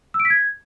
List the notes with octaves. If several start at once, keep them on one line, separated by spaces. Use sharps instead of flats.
E6
D7
B6
G#6